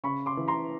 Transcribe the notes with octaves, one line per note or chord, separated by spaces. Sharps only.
C#3 B5 C#6
C6 D6
E3
A#5 C6